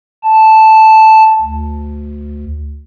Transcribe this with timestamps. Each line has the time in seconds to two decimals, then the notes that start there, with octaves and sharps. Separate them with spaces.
0.24 A5
1.41 D2